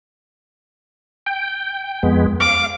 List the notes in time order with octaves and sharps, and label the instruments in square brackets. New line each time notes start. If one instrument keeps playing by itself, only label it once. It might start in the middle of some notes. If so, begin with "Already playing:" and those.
[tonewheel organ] G5
F2 G#3 B3
[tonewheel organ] F5 [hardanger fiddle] D6